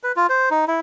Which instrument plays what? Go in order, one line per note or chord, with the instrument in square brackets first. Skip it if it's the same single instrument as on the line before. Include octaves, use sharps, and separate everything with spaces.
[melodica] B4
F4
C5
D#4
E4